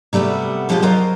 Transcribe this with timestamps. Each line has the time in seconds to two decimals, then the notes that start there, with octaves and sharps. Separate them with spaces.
0.13 C3 G3 A3 B3 F#4
0.69 B2 F3 G#3 B3 F4 G4
0.82 F#3 C4 F4 A#4 C5 D#5